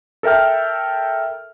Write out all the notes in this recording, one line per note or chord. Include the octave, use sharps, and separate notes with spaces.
A4 A#4 E5 G5 F6